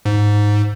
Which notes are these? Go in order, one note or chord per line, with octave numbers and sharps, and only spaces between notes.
G#2